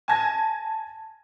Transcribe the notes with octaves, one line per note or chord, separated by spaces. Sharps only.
G#5 A5 G#6 A#6